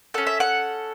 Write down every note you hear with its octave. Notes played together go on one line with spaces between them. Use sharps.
C#4 A4 F#5
E5
F#5